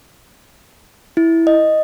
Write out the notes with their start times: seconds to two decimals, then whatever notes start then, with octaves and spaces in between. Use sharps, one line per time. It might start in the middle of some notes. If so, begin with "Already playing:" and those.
1.17 E4
1.47 D#5